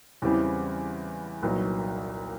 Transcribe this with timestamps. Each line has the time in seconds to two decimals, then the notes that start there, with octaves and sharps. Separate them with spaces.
0.22 E2 C#3 E3 G3 C4
1.43 C2 A#2 F#3 B3 D#4